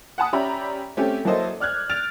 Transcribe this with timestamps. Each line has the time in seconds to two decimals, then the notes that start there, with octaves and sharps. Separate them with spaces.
0.18 F#5 G#5 A5 B5 D#6
0.33 C#4 G4 D5 E5 A#5 B5
0.97 A3 C4 C#4 G4
1.25 F#3 A#3 E4 A4 C5 D#5
1.60 D5 F6 F#6 G#6
1.90 F6 A6 D7 F7